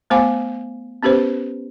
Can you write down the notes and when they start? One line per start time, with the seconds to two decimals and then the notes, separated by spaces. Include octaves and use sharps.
0.10 A3 B3 C5 F5 G#5 D6
1.03 B3 C#4 G4 B4 C5